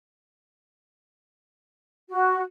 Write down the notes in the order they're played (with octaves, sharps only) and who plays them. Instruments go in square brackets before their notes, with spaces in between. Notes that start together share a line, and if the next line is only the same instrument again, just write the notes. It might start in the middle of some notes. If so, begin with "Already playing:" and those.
[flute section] F#4